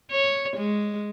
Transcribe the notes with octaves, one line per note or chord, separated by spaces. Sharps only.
C#5
G#3